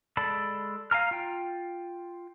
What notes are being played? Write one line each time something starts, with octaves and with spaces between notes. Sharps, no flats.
G#3 A4 D5 A5 B5
F5 G#5 A#5 F6
F4 G5